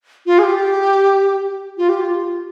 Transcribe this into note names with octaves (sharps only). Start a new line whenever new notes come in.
F4
G#4
G4
F4
G4
F4